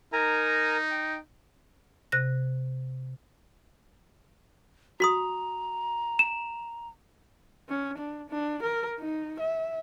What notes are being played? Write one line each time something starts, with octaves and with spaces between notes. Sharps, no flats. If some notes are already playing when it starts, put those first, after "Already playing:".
D#4 A#4 G#5 A#5
G5
C3 F#6 A#6
F#4 A#5 C6 D#6
E7
C#4
D4
D4
A#4
D#4
E5